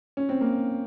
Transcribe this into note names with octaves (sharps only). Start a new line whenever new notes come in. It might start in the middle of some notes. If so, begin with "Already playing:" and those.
C#4
C4
A#3